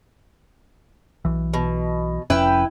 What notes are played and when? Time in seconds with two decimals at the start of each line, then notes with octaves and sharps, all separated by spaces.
1.25 B1 E3
1.54 B2
2.30 F1 F2 C#4 E4 B4 G5